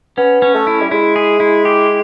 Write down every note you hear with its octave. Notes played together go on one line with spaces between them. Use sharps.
B3 C#4
C#4
A3
E4
G3
G#3 E4
G#4
E4
G4